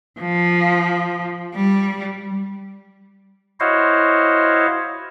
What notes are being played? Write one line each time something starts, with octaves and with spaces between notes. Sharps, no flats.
F3
G3
E4 F#4 C5 C#5 D#5 F5